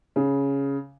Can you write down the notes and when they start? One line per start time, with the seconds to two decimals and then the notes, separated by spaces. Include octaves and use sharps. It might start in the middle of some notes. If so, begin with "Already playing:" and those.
0.16 C#3